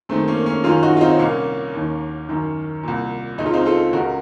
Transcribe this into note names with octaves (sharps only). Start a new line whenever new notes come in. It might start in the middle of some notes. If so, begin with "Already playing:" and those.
F#2 D#3 A3 C4
A#3 C#4
A#3 C#4
F#2 D#3 C#4 F4
D#4 F#4
F4
C4 D#4
D#4
C2 A#2 A#3 C#4
D#2 D#3
F#2 D#3
C2 A#2
C#2 C#3 D#4
F4
C4 D#4
F4 A4
C#2 C#3 F#4 A#4